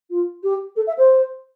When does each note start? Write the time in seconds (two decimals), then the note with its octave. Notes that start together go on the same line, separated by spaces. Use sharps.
0.10 F4
0.43 G4
0.76 A4
0.87 E5
0.98 C5